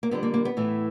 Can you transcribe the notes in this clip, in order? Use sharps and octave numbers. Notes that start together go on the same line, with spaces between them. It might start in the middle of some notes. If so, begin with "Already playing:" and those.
A#3
F2 D3 G3 B3
A#3
A#3
B3
A2 E3 A3